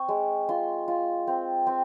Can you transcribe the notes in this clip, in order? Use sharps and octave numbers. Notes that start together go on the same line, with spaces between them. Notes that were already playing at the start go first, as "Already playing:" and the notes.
Already playing: C4 C#6
G#3
F4 C6
F4
C4
C4